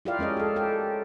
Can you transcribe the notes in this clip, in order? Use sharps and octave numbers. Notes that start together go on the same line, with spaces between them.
E4 F4 G4 A#4 D5 F5
G#3 C#4 A#4 D#5
G#4 A4
G4 A4